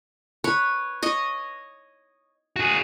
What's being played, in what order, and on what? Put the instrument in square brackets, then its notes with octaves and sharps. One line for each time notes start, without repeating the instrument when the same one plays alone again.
[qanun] B4 C#5
C#5 D#5
[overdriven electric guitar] F#4 G#4